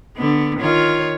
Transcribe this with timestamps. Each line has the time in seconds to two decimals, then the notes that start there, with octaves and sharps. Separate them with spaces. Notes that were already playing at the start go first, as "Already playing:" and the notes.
0.16 D3 B3
0.60 D#3 F4 C#5